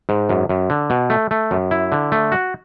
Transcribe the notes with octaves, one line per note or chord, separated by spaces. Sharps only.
G#2
F#2
F#2
D3
B2
A3
A3
F#2
E4
D3
A3
F#4